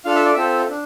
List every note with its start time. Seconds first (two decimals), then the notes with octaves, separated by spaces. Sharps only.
0.05 D4 F4 A4 F5
0.15 E5
0.26 D5
0.35 C4 F4 A4 E5
0.69 D4